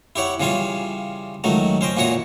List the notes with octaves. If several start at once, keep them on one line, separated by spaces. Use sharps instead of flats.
E4 G4 C#5 F#5
C#3 E3 G3 F4 G#5
C#2 D#3 F#3 A3
C#4 C5 D#5 G5
A#2 E3 F#4 C#5 D#6